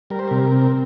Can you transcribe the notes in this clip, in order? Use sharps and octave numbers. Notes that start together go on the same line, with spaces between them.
G3 A#4
C5
C3 A#4
C4